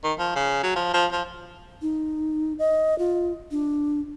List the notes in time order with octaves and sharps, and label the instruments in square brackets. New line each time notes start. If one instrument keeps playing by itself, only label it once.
[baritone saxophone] D#3
F3
C#3
F#3
F3
F3
F3
[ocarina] D#4
D#5
F4
D4